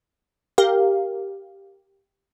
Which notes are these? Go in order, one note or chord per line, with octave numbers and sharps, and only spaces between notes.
G4 A#4 F5